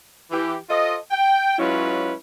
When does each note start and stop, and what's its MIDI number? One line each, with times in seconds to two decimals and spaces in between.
0.31 0.55 52
0.31 0.55 67
0.70 0.95 65
0.70 0.95 69
0.70 0.95 72
0.70 0.95 75
1.11 1.58 79
1.58 2.12 54
1.58 2.12 56
1.58 2.12 61
1.58 2.12 64
1.58 2.12 65
1.58 2.12 71